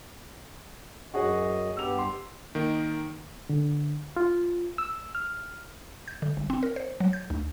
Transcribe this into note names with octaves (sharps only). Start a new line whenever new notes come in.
F#2 F#4 G#4 C#5 D#5
G2 B3 G4 E6 F7
C6
D#3 A#3
D3
F4
E6
F6
G6
D3
G1
C4
A#4
C5
F#3
G6
D2